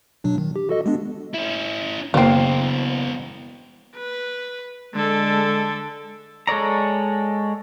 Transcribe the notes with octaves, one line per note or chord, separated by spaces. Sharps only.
B2 F#3 D4
D#3
G4
F#4 A4 D#5
G#3 B3 D4
C#4 E4
F#1 B2 E3 A#3 C4 C7
B4
D3 G#3 A4
G#3 A4 C#5 D5 A#5